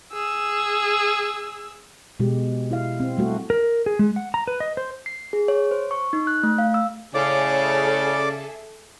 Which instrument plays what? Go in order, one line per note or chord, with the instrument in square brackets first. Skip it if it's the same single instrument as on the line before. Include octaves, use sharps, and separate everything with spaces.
[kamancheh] G#4 E6
[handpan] B2 G#3 G4
E4 F5
C4
G3 A3 F#4
[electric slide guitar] A#4
G#4
G#3
F#5
A#5
B4
D#5
C5
[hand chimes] C7
G#4
C#5
C5
C#6
D#4
F#6
A3
F5
E6
[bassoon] A2 [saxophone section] C#3 [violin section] G#4 A4 E5 [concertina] D5 D6